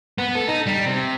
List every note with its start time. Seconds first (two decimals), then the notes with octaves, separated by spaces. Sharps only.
0.18 B3
0.35 A4
0.48 D#4
0.66 G3
0.86 C3